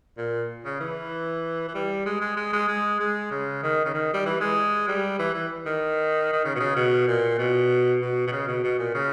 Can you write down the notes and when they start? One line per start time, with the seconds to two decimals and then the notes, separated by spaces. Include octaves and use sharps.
0.18 A#2
0.65 C#3
0.80 E3
1.68 E3
1.74 G3
2.06 G#3
2.21 G#3
2.37 G#3
2.53 G#3
2.68 G#3
3.00 G#3
3.31 C#3
3.63 D#3
3.85 C#3
3.94 D#3
4.13 G3
4.26 E3
4.41 G#3
4.88 G3
5.19 E3
5.34 E3
5.66 D#3
6.33 D#3
6.45 C#3
6.55 B2
6.60 C#3
6.76 B2
7.07 A#2
7.39 B2
8.01 B2
8.27 B2
8.32 C#3
8.48 B2
8.64 B2
8.79 A#2
8.95 C#3